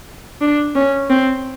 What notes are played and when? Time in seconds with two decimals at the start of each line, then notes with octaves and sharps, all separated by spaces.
0.41 D4
0.75 C#4
1.10 C4